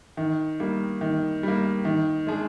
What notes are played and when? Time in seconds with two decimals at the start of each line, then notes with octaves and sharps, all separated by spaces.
0.17 D#3
0.60 G3 A#3
1.01 D#3
1.43 G3 A#3
1.85 D#3
2.27 G#3 D4 G#4